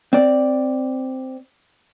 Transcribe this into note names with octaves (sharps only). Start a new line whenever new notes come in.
C4 D5